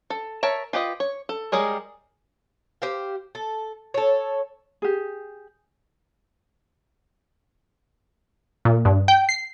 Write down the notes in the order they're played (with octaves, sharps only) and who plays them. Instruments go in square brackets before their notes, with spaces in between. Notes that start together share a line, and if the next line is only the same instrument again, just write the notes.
[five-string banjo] A4
A#4 C#5 E5 A5
F4 G4 B4 D#5
C#5
A4
G3 G#3 G#4 A#4 C#5
[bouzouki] G4 C5 F5
A4
A4 C#5
[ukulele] G4 G#4
[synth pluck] A#2
G2
G5
C7